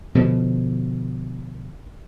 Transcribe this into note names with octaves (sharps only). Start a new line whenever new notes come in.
B2 D3 F3